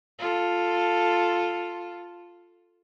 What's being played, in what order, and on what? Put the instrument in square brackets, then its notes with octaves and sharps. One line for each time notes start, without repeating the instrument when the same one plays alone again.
[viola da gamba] F4 A4